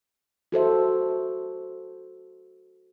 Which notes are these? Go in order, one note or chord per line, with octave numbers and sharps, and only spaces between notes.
F#4 A4 C5 E5